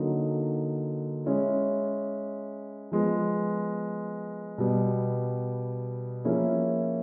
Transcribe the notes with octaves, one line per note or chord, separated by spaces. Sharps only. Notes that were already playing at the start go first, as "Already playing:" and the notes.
Already playing: D3 F#3 A#3 D#4
G#3 C#4 E4
F3 G#3 B3
B2 G3 B3
F3 A#3 C#4 E4 G#4